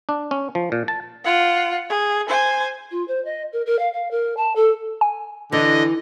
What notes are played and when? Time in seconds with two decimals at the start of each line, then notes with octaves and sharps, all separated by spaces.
0.09 D4
0.31 C#4
0.55 F3
0.72 A#2
0.88 A5
1.24 F4 F#5
1.89 G#4
2.29 C5 G#5
2.91 F4
3.08 C5
3.25 D#5
3.52 A#4
3.66 A#4
3.79 F5
3.93 F5
4.11 A#4
4.37 A5
4.55 A4
5.01 G#5
5.52 D3 E3 D#5